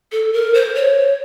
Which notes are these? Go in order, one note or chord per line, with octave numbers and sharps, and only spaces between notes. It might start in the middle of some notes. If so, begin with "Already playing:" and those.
A4
A#4
C5
C#5